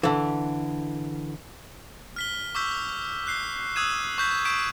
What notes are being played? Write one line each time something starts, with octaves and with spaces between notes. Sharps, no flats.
D3 E3
F6 B6 G7
C#6 D6 E6 G6 B6
F#6 C7 G7
D#6 E6 F#6 G#6 D#7 E7
C#6 G6 B6
C#6 E6 G6 B6 D7 E7